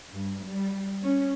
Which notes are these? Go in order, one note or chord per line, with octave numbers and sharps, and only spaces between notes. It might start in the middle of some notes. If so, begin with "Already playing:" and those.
G2
G3
C#4